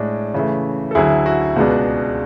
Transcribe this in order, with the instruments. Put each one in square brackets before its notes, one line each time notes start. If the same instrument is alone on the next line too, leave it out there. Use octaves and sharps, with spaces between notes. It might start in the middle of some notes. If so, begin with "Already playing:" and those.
Already playing: [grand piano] A2 G#3 D4
C#3 E3 A3
A4
D2 D3 F#3 E4 G#4
F#4
C#2 B2 G#3 B3 D4